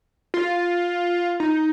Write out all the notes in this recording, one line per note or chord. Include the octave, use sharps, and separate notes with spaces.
F4
D#4